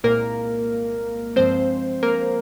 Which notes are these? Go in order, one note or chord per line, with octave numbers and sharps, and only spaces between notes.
C2 A#2 G#3 A#3 A#4
G2 F3 G#3 C4 C5
A#3 A#4